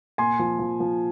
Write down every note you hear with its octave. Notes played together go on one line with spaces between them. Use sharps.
A#2 G#5 C6
F3
F3
F3